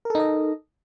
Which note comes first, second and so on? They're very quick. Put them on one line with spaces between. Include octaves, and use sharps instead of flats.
A#4 A4 D#4 D#5